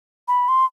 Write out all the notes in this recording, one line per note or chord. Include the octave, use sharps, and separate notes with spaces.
B5
C6